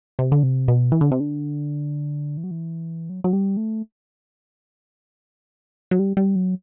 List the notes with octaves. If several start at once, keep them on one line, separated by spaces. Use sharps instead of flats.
C3
D3
C3
B2
E3
D3
C3
D3
E3
F#3
E3
F#3
F#3
G3
A3
F#3
G3
G3
F#3